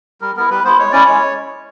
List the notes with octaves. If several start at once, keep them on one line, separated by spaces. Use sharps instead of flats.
G3 A#4
B3 E4 A#4
G3 B4
B3 E4 C5
G#3 C#5
C#4 E4 D5
G#3 C#5